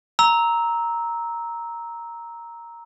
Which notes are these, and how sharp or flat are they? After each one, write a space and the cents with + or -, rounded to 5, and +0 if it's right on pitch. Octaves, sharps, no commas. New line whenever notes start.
A#5 +0 E6 -20